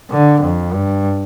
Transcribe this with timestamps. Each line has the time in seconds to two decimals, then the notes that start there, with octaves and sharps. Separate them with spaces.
0.11 D3
0.41 F2
0.73 G2